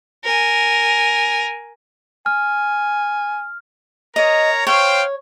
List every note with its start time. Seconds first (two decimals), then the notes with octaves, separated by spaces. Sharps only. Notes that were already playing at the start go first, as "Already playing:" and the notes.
0.24 A#4 G#5
2.26 G#5 F6
4.16 A#4 C#5 D#5 A#5
4.67 C5 C#5 F5 G5